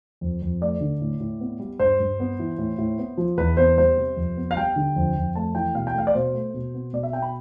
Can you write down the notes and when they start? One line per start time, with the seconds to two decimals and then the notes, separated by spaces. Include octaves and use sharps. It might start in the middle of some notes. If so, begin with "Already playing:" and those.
0.21 F2
0.42 F2
0.61 A3 D5
0.81 D3
1.01 A2
1.20 A2
1.41 B3
1.60 G3
1.79 G2 C5
2.00 G2
2.20 B3
2.39 E3
2.58 A2
2.78 A2
2.98 B3
3.17 F3
3.37 E2 B4
3.57 B3 C5
3.77 G3 C5
3.97 C3
4.17 F2
4.37 B3
4.51 F5
4.56 G3 G5
4.76 D3
4.96 F2
5.15 F2
5.35 A3 A5
5.55 E3 G5
5.75 B2 F5
5.87 G5
5.94 A3 F5
6.07 D5
6.15 B2 C5
6.35 A3
6.54 B2
6.74 B3
6.93 B2 D5
7.03 E5
7.13 B3 G5
7.22 B5